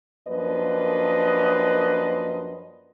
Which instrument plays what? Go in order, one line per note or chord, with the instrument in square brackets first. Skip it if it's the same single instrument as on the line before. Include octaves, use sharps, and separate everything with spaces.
[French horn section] F#2 F3 A#3 D4 B4 D#5